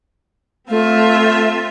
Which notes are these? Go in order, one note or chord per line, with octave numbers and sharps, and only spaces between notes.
A3 C4 F4 E5